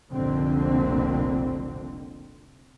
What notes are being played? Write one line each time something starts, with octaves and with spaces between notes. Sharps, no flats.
F1 C2 F2 A#2 D3 C4